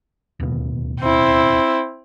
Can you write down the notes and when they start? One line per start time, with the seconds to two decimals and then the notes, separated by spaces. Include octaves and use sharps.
0.40 D1 D#2 B2
1.01 C4 E4